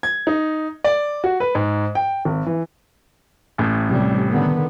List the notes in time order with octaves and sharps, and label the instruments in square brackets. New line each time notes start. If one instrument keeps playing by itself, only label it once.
[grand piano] G#6
D#4
D5
F#4
B4
G#2
G5
G#1
E3
A1 A2
[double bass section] F2 C3 G3
D3 D#3 B3